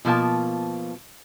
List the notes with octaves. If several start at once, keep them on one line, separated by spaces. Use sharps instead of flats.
B2 F3 A#3 A5